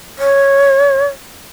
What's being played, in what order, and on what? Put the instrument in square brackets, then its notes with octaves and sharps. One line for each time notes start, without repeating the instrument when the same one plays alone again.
[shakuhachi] C#5